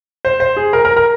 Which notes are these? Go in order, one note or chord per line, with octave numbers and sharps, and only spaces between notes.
C5
C5
G#4
A#4
A#4
A#4